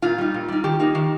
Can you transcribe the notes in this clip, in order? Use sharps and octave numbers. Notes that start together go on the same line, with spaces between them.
A#2 F4
G3 D#4
A#2
G3 D#4
D#3 G4
A#3 D#4
D#3